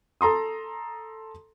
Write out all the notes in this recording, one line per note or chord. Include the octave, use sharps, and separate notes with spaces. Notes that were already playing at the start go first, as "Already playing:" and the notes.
A4 A#5 C6 D#6